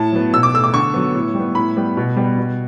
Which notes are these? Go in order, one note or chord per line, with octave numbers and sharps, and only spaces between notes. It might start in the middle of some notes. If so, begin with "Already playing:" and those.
Already playing: A2 A5
F#3 B3
B2 E6
D6
A3 E6
D6
D3 C#6
F#3 B3
A2
G3
B3
A2 B5
G3 B3
B2
G3 B3
B2